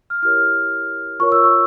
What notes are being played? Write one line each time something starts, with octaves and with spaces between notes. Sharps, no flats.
F6
E4 G4 A#4 C#5 F6
F4 A#4 C#5 C#6
E6
C#6